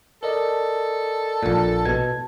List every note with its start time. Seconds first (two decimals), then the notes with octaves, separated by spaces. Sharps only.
0.23 A4 A#4 D5 D#5
1.43 A#1 A#2
1.86 B2 A5 G#6